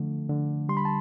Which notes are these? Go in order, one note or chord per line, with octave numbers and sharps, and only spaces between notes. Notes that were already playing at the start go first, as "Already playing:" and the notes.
Already playing: D3 F3 A3
D3
G3 C6
B5
A5